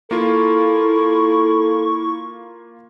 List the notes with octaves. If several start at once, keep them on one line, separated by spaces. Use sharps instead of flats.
A#3 E4 F4 A4 C#6